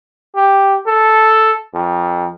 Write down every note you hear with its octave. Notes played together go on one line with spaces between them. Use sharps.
G4
A4
F2